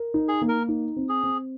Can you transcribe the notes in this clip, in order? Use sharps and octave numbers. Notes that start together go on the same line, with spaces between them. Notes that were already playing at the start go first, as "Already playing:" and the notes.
Already playing: A#4
D#4
G#4
A#3
A#4
D#4
C4
G#4
C4